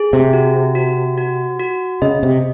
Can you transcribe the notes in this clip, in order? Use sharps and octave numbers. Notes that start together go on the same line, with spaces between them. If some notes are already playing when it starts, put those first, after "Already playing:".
Already playing: G#4
C3
F#4
F#4
F#4
F#4
C#3 D#5
C3